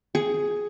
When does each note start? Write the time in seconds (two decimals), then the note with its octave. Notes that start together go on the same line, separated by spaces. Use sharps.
0.15 G#4